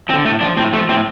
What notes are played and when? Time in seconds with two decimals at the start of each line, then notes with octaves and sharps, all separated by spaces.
0.09 F3 C4
0.13 D3
0.25 A2 A3
0.41 F3 D4
0.57 A2 C4
0.73 F3 A3
0.89 A2 C4